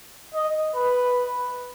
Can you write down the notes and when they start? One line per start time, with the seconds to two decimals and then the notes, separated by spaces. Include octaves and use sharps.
0.34 D#5
0.76 B4